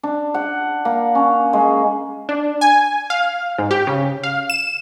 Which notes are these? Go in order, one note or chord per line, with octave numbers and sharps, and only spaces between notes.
D4
F#5
A#3
C#4
G#3
D4
G#5
F5
G#2
G4
C#3
F5
E7